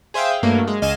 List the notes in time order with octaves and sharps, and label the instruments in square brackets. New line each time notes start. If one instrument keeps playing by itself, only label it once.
[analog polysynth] G#4 C5 E5 F5 G5
G2 F#3 A3 A#3
G#3
C#2 D#5 F5 G#5 D#7 E7